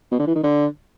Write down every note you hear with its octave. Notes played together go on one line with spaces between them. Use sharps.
B2
D3
E3
D#3
D3